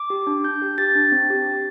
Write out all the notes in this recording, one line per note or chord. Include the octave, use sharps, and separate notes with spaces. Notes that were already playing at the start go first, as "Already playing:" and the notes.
Already playing: D6
G4
D4
D4 G6
G4
G4 A6
D4
C4
G4
G4